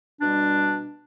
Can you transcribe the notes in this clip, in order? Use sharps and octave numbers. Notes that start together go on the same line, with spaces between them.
B2 G3 D4